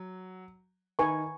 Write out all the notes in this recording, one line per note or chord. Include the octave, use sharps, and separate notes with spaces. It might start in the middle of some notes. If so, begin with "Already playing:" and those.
Already playing: F#3
D#3 B4 G#5 C#6